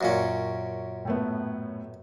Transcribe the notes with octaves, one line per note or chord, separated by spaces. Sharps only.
F#2 A#2 C#4
A2 A3 B3